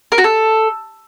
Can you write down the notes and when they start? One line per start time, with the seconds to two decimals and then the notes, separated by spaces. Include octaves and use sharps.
0.12 A#4
0.18 F#4
0.24 A4